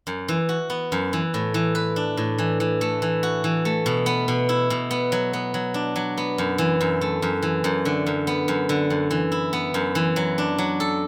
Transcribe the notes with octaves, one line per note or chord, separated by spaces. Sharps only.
F#2
E3
F#4
B3
F#2
E3
A2
E3
B4
D4
A2
E3
E3
A3
E3
F#4
E3
A3
B2
B3
B2
E4
B2
B3
F#3
B3
F#3
D4
F#3
B3
F#2
E3
F#2
A3
F#2
E3
F#2
D3
F#2
B3
F#2
D3
F#2
E3
E4
B3
F#2
E3
F#3
D4
F#3
A4